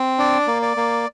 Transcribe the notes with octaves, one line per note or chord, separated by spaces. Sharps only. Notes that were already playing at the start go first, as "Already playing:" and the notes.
Already playing: C4
D4 D5
A#3
D5
A#3